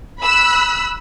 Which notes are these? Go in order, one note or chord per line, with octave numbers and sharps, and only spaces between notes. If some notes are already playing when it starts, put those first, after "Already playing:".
B5 E6 F#6